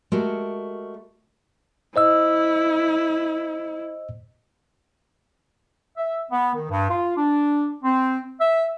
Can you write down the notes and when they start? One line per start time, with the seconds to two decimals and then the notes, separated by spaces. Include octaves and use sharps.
0.12 G#3 A3 F#4 G4 A#4
1.96 E4 C5 D#5 E6
5.97 E5
6.30 B3
6.54 D#3
6.69 G2
6.90 F4
7.16 D4
7.83 C4
8.40 E5